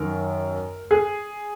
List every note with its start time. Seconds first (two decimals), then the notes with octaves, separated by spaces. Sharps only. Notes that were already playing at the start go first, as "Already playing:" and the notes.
Already playing: F#2 D#3 A#4
0.91 G#4